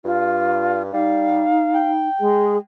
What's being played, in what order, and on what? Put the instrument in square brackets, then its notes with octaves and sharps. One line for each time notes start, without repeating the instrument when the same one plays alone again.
[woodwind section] G2 [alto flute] F4
[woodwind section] G3 [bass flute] D#4 [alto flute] F5
[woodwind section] G5
[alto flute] G#3 [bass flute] G#4